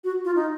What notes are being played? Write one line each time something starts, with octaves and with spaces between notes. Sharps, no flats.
F#4
F4
D#4